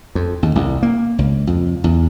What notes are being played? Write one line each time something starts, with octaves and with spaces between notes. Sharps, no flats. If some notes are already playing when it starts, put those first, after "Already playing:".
F2
D#2
C2
A#3
C#2
F2
E2